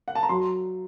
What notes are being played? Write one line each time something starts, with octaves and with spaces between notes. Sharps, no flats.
F#5
A5
A#5
F#3 C6